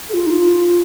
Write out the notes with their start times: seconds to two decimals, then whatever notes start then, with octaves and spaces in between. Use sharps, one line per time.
0.09 A4
0.13 F4
0.26 D#4
0.30 F4